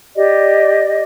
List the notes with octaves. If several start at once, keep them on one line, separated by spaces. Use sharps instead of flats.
G4 D5 D#5